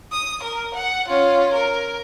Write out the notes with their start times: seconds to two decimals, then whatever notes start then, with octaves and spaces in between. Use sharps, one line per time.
0.12 D#6
0.43 A#4
0.75 F#5
1.08 C#4 F4
1.53 A#4